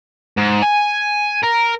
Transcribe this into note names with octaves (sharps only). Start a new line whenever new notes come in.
G#2
G#5
A#4